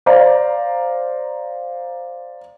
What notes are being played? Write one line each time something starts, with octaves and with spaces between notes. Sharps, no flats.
C5 D5 F5 A#5